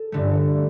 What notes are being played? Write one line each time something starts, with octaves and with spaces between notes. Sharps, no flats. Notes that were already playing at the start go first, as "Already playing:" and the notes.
Already playing: A4
G2 D3 A3